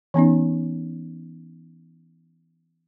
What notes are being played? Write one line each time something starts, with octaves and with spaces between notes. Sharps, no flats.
E3 B3 C#4 D#4